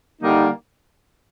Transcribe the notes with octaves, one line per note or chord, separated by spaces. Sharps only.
D3 G3 A#3 D#4